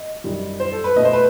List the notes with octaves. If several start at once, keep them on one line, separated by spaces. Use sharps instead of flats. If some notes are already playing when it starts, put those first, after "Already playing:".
Already playing: D#5
F#2 D#3 G3
C5
A4
B4
B2 A3 D#5
C5
B4